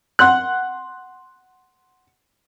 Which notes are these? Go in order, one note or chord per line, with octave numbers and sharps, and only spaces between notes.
F#5 C6 F#6